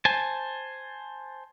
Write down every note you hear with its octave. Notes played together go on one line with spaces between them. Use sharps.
C5 G#5 A5